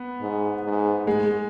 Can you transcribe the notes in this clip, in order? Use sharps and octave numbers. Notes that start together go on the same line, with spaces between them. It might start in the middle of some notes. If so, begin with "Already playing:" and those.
Already playing: B3
G#2
G#2
G#2 G#3